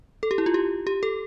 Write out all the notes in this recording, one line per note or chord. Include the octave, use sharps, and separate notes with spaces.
A4
G4
E4
F4
G4
G4
A4